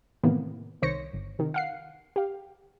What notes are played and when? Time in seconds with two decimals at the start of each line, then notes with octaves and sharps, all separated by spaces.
0.23 A2 C3 D#3 E3 A#3 B3
0.82 C2 D#3 C5 C#5 A#6 C#7
1.13 G1
1.39 C3 D#3
1.54 F5 F#5 C7
2.16 G4 F5